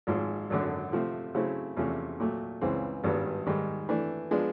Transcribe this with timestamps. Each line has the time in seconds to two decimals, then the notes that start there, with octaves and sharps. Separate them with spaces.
0.07 G#1 G#2 F3
0.50 G#1 F#2 D3
0.92 C3 F3 A3 C4
1.35 C#3 F#3 A3 C4 E4
1.77 E2 C3 F3 A3 C#4
2.20 A#2 F#3 A3
2.61 C#2 C#3 E3 G#3 C4
3.04 G#1 G2 D#3 G3 B3
3.47 G#2 D#3 G3
3.89 E3 A3 D4
4.31 F3 G#3 B3 D4